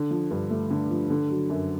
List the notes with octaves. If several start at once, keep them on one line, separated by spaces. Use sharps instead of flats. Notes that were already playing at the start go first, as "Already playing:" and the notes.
Already playing: D3
F3
G2
A3
D3
F3
D3
F#3
F#2